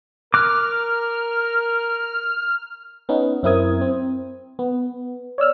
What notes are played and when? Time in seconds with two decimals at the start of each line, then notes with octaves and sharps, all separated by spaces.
0.34 A#4 D6 F6 F#6
3.09 B3 C#4 D#4
3.43 F#2 C4 E4 A#4 D#6 G#6
3.81 C4
4.59 B3
5.38 C#5 D5 E6 F6